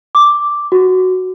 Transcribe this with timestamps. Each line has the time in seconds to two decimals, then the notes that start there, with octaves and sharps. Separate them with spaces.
0.15 D6
0.72 F#4